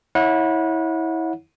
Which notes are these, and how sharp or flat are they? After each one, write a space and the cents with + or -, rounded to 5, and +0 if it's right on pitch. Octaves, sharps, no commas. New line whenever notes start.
E4 -25 C#5 +0 F#5 -30